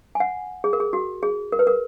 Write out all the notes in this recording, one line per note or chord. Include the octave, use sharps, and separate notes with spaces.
G#5
F#5
G#4
A#4
G#4
F#4
G#4
A#4
B4
A#4